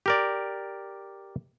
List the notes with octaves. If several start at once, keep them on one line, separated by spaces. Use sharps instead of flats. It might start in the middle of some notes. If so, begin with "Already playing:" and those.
G4 A#4 D5